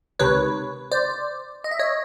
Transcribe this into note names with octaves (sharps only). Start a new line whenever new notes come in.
C#2 C3 D#3 B4 C#5
C5 D5
D#5
E5
C#5 D#5